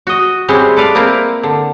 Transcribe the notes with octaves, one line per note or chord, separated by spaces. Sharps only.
F#4 D#5
G3 G#3 C4 C#4 E4 F#5
A4 B4 D5 F5
A#3 C4 E4 A#4
D3